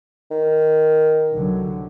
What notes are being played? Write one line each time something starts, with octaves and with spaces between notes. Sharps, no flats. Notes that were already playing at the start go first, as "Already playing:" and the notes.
D#3
C2 D3 F#3